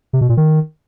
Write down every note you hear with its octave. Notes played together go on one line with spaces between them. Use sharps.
C3
B2
A#2
D#3